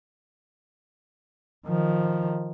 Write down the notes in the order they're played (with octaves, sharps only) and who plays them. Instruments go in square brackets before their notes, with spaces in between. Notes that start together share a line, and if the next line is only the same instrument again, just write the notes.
[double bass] D#3 F3